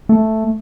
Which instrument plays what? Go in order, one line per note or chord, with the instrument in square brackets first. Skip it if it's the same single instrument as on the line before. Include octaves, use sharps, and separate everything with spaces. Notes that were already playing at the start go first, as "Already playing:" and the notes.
[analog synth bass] A3